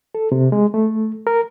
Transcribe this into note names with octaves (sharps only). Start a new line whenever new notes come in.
A4
C3
G#3
A3
A#4